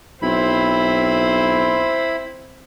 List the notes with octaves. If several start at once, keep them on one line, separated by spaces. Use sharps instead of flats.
B1 C4 E4 C5 B5